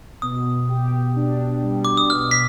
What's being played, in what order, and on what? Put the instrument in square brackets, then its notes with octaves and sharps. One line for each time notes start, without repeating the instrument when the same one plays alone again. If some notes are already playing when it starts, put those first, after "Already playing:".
[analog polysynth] B2 [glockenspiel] D#6
[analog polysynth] G4
D4
G3
[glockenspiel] D6
D#6
[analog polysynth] B2 [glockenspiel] F6
[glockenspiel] B6